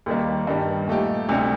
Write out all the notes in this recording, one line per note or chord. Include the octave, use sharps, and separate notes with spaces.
D#2 D#3 G3 A#3
G2 D#3 G3
A#2 A3 D#4 G4
D2 C3 G3